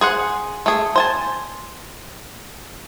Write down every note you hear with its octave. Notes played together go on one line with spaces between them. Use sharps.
G#4 C5 F#5
A3 G#4
C5 G#5 A5